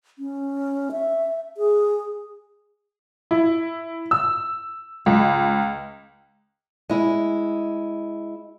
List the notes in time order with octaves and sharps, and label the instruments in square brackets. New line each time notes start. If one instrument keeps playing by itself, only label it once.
[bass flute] C#4
E5
G#4
[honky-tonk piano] E4
E6
C#2
[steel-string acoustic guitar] G#3 E4